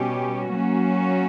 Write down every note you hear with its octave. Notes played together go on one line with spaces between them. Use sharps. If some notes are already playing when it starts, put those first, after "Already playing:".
Already playing: B2 G3 C#4 G4
F#3 A#3 C#4 F#4